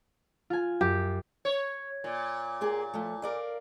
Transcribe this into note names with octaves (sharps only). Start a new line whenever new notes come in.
F4 G#5
F#2 G4
C#5
A#2
A#3 G4 G#4
F3 A3
A#4 D5 F5